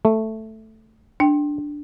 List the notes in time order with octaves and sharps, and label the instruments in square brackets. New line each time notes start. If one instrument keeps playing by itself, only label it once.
[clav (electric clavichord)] A3
[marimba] D4 G5